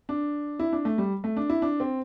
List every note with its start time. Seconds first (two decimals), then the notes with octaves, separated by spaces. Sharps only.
0.09 D4
0.59 E4
0.72 D4
0.85 A3
0.98 G3
1.24 A3
1.37 D4
1.50 E4
1.62 D4
1.80 C4